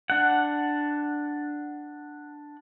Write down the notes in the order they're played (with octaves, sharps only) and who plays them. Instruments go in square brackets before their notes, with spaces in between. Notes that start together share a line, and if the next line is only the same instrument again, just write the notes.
[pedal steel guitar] D4 F#5